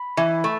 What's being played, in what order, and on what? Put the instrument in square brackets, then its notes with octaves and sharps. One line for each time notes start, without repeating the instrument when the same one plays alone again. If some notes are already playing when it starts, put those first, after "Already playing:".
Already playing: [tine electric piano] B5
[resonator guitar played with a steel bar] E3
A3